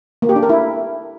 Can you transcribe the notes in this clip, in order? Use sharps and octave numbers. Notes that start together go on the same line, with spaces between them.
A#3
G4
D4
A#4
E4